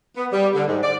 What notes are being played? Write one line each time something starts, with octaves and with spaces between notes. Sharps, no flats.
B3
G3
D3
G#2
D5